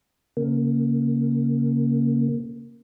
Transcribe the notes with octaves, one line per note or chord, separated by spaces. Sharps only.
C#3 A#3